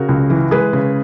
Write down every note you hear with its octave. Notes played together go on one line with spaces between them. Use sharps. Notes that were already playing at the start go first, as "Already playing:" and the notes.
Already playing: C#3 F#4 A#4
C#2
E3
G#3 G#4 B4
C#3